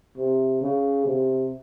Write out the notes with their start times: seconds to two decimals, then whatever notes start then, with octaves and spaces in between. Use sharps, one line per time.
0.17 C3
0.61 C#3
1.06 C3